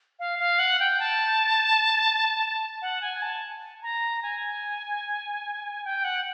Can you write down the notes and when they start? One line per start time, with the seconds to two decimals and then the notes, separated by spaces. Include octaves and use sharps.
0.19 F5
0.39 F5
0.59 F#5
0.80 G5
1.00 A5
2.82 F#5
3.01 G#5
3.22 A5
3.83 A#5
4.23 G#5
5.85 G5
6.04 F#5